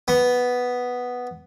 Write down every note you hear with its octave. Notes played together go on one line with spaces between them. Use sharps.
B3